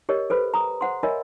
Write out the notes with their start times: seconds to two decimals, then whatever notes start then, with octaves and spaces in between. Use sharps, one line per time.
0.09 G4 A#4 C#5 D#5
0.30 A4 B4 C5 B5
0.54 A#5 D#6
0.81 C5 F#5 C6
1.03 A#4 C#5 D#5 E5 G#5 B5